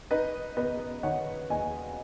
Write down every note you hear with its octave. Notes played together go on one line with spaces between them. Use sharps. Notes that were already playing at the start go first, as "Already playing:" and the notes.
D#4 B4 D#5
B3 B4 D#5
D#3 C#5 F#5
D#2 D#5 G#5